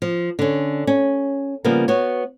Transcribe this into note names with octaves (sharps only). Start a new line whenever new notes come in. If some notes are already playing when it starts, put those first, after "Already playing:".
F3
D3 C#4
C#4
C#3 F3 G3 A#3 B3
B3 F#4 C#5